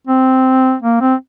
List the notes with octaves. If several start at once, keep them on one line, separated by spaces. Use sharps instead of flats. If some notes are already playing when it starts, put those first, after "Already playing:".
C4
A#3
C4